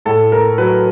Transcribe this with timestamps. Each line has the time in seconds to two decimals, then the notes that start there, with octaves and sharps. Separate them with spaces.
0.05 A2 A4
0.32 A3 A#4
0.58 F#3 B4